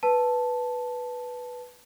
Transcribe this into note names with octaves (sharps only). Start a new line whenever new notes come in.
B4 A5